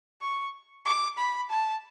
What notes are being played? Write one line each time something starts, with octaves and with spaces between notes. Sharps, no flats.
C#6
D6
B5
A5